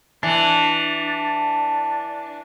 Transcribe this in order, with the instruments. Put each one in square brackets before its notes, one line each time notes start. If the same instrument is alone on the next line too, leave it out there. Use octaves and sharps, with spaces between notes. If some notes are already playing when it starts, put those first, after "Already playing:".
[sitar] E3 [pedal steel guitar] D4